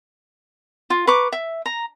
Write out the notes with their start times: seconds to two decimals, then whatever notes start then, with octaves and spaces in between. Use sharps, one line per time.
0.90 F4
1.07 B4 A#5 C#6 D6
1.32 E5
1.66 A#5